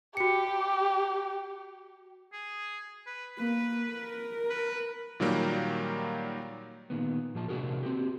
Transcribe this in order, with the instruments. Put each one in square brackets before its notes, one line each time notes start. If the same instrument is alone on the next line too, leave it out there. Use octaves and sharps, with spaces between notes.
[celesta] F#4 C#7 [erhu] G4
[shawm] G#4
B4
[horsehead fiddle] A#3 [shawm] B4
[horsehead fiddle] A#4
[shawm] B4
[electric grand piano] A#2 D#3 F#3 G3 A#3
[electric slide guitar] A#2 D#3 B3
A#2 F3 F4 A5
C3 D4 F#4 G#4 A#4
C4 F#4 G4